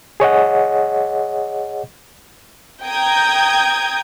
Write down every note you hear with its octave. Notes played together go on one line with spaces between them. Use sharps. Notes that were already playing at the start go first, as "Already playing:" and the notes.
G#4 C#5 D#5 F#5
G5 A#5 D#6 G6 G#6